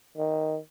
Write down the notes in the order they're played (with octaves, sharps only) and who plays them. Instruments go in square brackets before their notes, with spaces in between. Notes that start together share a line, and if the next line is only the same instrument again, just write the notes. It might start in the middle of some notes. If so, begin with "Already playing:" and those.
[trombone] D#3